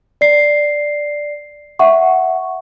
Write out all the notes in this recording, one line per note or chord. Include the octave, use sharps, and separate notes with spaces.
D5 C7
E5 F#5 C#6